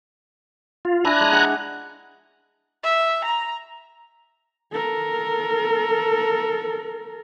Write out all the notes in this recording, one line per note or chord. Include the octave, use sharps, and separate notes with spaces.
F4
D4 E4 G#5 A#5 F#6
G#3
G#4 F#5 B5
E5
A#5
A4 A#4